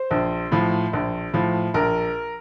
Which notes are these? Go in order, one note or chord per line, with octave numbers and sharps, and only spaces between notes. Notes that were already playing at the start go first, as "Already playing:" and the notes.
Already playing: C5
A#1
A2 F3
A#1
A2 F3
A#1 A#4